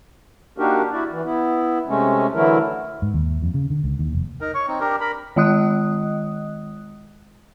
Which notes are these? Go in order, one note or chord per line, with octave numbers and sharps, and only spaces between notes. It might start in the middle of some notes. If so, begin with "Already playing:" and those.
A#3 D4 D#4 F#4 G4 A#4
E4 F#4 D5
E3
B3 E4
C3 G#3 A3 C#4
D3 E3 F#3 A3 E4 A#4
G#2
D#2
F2
C#3
D3
C#2
D#2
F1
D#4 A#4
C#5 C#6
C4 D#4
D4 G4 A#4
A#4 B5
D#3 G#3 D#5 D#6 F#6